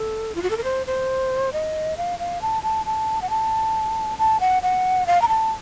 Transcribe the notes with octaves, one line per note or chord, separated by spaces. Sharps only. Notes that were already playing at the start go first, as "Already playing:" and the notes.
Already playing: A4
F4
F#4
A4
A#4
C5
C5
D#5
F5
F5
A5
A5
A5
F#5
A5
A5
F#5
F#5
F5
A#5
A5